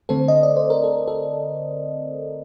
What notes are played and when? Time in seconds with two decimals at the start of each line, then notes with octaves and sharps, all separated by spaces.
0.09 D3 A3 C4 A4 C5
0.28 D#5
0.43 D5
0.57 C5
0.70 A#4
0.84 A4
1.08 A4